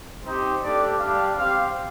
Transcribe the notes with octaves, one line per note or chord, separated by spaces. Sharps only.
C4 D#4 G4 C5
A3 D4 G4 D5
G3 D4 G4 F5
C4 G4 F5